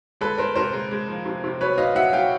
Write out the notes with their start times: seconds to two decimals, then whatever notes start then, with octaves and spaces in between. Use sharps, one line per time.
0.21 G#3 A4 B4
0.38 G#3 A#4 C5
0.56 C3 A#4 C5
0.73 G#3
0.91 G#3
1.08 F3
1.26 C3
1.44 C3
1.61 F#3 B4 C#5
1.78 F#3 D#5 F5
1.95 F#3 E5 F#5
2.13 F#3 F5 G5